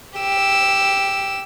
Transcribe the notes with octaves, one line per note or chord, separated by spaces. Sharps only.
G4 E6